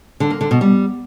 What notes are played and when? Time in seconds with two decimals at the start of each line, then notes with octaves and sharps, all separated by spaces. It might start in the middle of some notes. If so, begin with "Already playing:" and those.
0.20 D3
0.30 A#3
0.41 D3
0.51 B2
0.61 G3